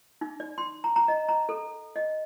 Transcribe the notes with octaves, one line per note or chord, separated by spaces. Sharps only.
D#4
D5
C6
A#5
A#5
D#5
A#5
A4
D#5